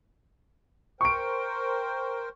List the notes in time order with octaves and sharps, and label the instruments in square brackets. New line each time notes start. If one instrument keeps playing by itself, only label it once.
[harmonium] A#4 C5 G5 [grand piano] C#6 D7